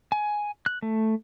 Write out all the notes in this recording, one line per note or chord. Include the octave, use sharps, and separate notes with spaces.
G#5
F#6
A3